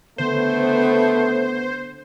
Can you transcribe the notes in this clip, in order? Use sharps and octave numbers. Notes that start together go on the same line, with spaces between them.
D3 A3 B3 C5